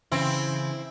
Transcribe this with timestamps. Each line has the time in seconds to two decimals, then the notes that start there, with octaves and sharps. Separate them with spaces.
0.12 C#3 E3 C4 E4